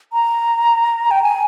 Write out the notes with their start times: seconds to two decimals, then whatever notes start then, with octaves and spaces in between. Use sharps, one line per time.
0.13 A#5
1.11 G5
1.23 G#5